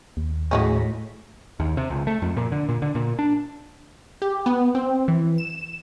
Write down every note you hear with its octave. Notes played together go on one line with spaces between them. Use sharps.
D#2
A2 F#3 G#3 C#4
D#2
C3
C#2
A3
F2
A#2
D3
A#2
D3
A#2
D4
G4
B3
C4
E3
E7